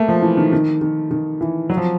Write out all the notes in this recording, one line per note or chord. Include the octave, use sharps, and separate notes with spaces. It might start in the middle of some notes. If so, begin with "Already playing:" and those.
Already playing: A3 A#3
F3
E3
D#3
D#3
D#3
D#3
E3
F#3
F3